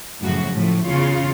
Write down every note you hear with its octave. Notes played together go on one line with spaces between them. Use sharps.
F#2 A2 C#3 F3 F#4
A2 F3 A3
E2 C#3 F4 C#5